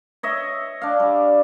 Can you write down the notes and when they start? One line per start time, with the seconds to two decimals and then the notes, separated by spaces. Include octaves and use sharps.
0.23 C#5 D#5 E5
0.82 D4 F5
1.00 G3